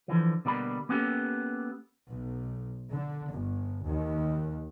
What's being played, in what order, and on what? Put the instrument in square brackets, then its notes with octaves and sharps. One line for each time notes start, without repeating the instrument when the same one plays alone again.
[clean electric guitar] D3 E3 F3
B2 D3 G3 A#3 B5
A#3 B3 C#4 F4 G4 A4
[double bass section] B1
D3
G1
D#2